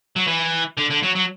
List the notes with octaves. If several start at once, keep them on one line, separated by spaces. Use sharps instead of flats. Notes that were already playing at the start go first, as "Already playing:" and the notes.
F#3
E3
D3
D3
F#3
F#3